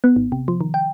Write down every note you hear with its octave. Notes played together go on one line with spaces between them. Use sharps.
B3
G#1
C3
F3
D#3
G5